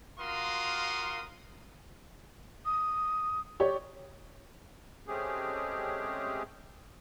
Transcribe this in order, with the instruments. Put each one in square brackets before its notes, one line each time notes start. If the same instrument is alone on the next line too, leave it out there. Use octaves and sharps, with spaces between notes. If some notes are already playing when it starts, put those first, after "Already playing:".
[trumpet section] F4 F#4 A#4 F5 C6 D#6
[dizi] D#6
[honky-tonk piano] G4 C#5 D5
[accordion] G#3 A3 C4 C#4 G4 G#4